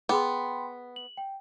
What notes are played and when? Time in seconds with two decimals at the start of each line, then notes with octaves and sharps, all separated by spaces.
0.09 B3 G#4 G5 B5 C6 D6
0.96 F#7
1.17 G5